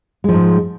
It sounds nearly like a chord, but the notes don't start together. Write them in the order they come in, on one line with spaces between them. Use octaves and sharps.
G#3 F3 G#2